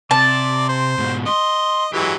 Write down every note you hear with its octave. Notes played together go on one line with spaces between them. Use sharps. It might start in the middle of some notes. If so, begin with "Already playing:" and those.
C3 D5 A5
C5
G#2 B2
D#5 C6
E3 F#3 G#3 G4 B4